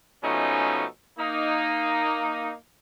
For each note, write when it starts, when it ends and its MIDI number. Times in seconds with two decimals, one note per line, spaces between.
0.23 0.84 47
0.23 0.84 53
0.23 0.84 56
0.23 0.84 57
0.23 0.84 61
0.23 0.84 63
1.18 2.53 58
1.18 2.53 63